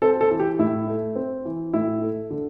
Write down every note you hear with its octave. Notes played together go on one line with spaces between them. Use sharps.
C4 A4
A4
E3
G4
A2 E4
A3
C4
E3
A2 E4
A3
D3